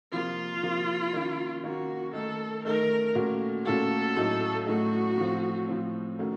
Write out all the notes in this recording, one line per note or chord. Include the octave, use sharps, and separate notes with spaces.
C3 F3 A#3 F4
C3 F3 A#3
D#3 A#3 C#4
D#3 A#3 C#4 F#4
D#3 A3 D#4 A4
D#3 A3 D#4 A#4
A#2 A3 C#4 F#4
A#2 A3 C#4 F#4 A4
A2 F#3 A3 D#4
A2 F#3 A3 D#4 F#4
A2 F3 C4
A2 F3 C4
D#3 A3 C#4 F#4